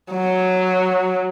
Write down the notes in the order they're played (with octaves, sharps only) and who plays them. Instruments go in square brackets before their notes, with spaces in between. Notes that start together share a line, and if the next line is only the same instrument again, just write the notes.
[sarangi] F#3